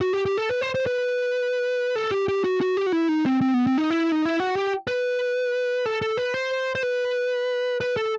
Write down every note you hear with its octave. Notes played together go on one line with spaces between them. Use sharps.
F#4
G4
G4
A4
B4
C5
C5
B4
A4
G4
G4
F#4
F#4
G4
F#4
E4
D#4
C4
C4
B3
C4
D#4
E4
D#4
E4
F#4
G4
B4
A4
A4
B4
C5
C5
B4
B4
A4